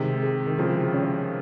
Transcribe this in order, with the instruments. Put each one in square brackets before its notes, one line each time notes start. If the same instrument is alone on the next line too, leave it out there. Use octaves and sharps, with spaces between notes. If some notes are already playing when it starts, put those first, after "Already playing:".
Already playing: [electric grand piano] C3 D#3 [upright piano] G#3
[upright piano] G#4
[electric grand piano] D#3
[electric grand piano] C#3 F3 [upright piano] G#3
[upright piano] C#4